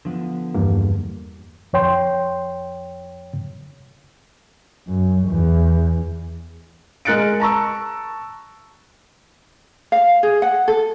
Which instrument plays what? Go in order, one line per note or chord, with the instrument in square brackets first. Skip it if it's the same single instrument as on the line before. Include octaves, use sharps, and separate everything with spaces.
[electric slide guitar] D3 F3 B3
[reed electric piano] E2 G2 A#3
F2 C#5 G5 C6
[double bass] F#2
E2
[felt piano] G#3 A#4 F#6 A6 C#7 D7
A5 A#5 C#6 E6
[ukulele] F5
G#4
F#5
A4